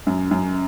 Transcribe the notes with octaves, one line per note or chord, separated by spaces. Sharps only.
F#2
F#2